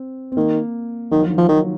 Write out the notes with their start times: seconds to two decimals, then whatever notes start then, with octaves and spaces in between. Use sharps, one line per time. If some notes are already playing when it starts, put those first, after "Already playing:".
Already playing: C4
0.32 C4
0.37 D#3 A#3
1.11 D#3 F#3
1.21 F3
1.30 D#3
1.38 F3 F#3
1.49 D#3 F3